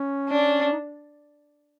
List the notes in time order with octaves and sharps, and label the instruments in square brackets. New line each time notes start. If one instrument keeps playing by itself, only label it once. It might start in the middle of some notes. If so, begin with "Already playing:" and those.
Already playing: [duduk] C#4
[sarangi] D4
[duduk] D#4